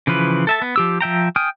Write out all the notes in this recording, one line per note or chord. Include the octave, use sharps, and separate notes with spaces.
C#3 E3 F3 B4
A4 E5 A5
B3
F3 G4 E6
F3 E5 G5 A#5
G5 G#5 D#6 F6